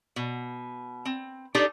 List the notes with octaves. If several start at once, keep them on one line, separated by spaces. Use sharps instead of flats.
B2
C4
D4 D#4 G4 A4 D5